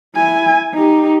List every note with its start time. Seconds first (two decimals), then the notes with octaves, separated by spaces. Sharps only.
0.16 E4 G#5
0.74 D#4 G4